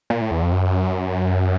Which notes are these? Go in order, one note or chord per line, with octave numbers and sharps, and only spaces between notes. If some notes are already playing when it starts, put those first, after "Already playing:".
A#2
A2
E2
F2
F#2